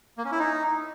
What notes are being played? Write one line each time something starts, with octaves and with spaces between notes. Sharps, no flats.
A#3
C#4
E4
D#4